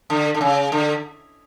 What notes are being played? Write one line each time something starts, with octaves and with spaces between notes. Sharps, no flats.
D3
D3
C#3
D3